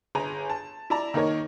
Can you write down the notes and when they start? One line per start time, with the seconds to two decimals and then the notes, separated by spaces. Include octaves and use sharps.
0.15 G1 G#4 G#5 A#5
0.50 A5
0.90 E4 D5 A5 A#5
1.14 D#3 A#3 D#4 A#4 C#5